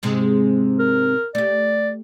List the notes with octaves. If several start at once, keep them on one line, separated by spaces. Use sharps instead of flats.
G#2 C3 G#3
A#4
A3 G4 D5